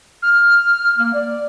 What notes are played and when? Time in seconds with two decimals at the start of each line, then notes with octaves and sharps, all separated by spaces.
0.22 F6
0.98 A#3
1.14 D5